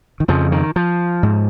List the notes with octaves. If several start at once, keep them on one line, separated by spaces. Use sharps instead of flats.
D#3
F2 C#3 F3
D#3
F3
G#2